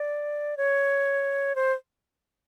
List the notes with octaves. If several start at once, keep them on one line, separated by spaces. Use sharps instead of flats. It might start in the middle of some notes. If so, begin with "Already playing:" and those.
Already playing: D5
C#5
C5